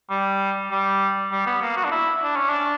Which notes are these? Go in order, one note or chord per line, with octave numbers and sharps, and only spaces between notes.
G3
G3
G3
B3
A#3
F#4
D4
E4
D4
C#4
D4